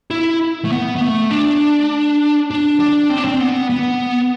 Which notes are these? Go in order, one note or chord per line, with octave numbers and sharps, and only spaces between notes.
E4
A3
B3
B3
A3
D4
D4
D4
C4
D4
C4
B3
B3